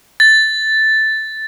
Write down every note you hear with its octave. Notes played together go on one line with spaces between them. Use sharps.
A6